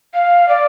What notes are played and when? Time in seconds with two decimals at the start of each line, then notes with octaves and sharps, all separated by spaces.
0.14 F5
0.49 D5